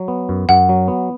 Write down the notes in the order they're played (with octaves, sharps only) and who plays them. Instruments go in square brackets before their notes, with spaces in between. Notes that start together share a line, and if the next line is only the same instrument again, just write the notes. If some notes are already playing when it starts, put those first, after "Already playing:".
Already playing: [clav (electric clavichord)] F#3
B3
F#2
[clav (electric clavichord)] F#2 [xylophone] F#5
[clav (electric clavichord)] F#3
B3